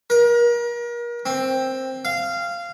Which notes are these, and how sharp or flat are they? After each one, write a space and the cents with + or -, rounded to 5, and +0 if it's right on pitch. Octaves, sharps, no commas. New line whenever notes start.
A#4 +35
C4 +10
F5 -15